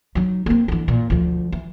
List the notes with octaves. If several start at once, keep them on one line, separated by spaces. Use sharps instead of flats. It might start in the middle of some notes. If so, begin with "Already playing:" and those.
F#3 D#4
A#3 C4
D3 E3
A#2
D2 F3
E3